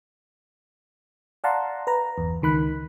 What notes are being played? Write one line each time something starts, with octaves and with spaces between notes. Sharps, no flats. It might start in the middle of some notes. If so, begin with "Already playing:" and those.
D5 F5 F#5 A5 A#5 C6
B4 A#5
G1 E2
C#2 D#3 B5 F#6